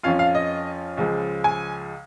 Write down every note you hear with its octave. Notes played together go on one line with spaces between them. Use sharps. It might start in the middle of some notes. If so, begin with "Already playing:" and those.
F2 F3 C#4 F4 F5
F5
D#5
C#2 C#3 F3 G#3
G#5